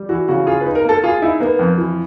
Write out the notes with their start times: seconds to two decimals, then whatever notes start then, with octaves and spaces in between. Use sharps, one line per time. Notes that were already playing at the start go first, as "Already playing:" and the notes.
Already playing: G3
0.09 E3 F#4
0.28 C#3 F#4
0.46 F4 G#4
0.61 B4
0.66 D#4
0.75 A#4
0.85 A#3 A4
1.04 F4 G#4
1.22 D#4 E4
1.40 A#3 B3
1.59 F2
1.78 E3